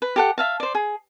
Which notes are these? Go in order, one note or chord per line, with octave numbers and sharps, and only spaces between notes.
B4
G4 A4 F#5
E5 F5 A5
C5 D5
G#4